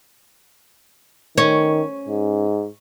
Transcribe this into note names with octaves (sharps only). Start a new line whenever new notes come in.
D#3 C#4
G#2